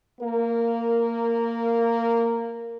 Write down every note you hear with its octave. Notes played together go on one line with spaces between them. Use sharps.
A#3 A#4